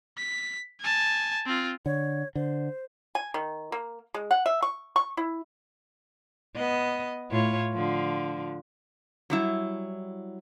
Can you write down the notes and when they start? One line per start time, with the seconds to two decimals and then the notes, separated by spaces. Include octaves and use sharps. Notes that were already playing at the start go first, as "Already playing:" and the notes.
0.18 B6
0.81 G#5 A5
1.46 C4 F4
1.86 D3 C#5
2.35 D3 C5
3.15 G#5
3.34 D#3
3.72 A#3
4.14 G#3
4.31 F#5
4.46 E5
4.62 C#6
4.96 C#6
5.17 E4
6.56 B3 D#5
7.31 A2 F4 C#5
7.73 D3 F3
9.30 F#3 G3 E4